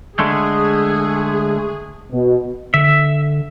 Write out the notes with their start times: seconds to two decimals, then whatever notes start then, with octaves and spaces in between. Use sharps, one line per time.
0.19 D3 G#3 A3 G#4
2.12 B2
2.74 D3 E5